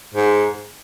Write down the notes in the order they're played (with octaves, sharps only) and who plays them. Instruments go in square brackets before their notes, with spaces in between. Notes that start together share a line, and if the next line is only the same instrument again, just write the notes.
[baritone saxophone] G#2